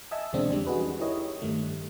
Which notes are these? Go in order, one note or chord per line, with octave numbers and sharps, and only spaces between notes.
D#5 E5 G#5 A5 E6
E2 B2 D3 G#3 C4 D4
E2 G3 D4
C#4 D#4 F#4 G#4 B4
E4 G4 A#4 C#5 D#5 E5
G2 D#3 G3 A3